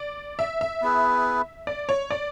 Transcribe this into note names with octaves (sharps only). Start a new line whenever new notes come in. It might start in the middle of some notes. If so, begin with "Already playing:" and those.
Already playing: D5
E5
E5
B3 E4 G#4 B4
D5
C#5
D5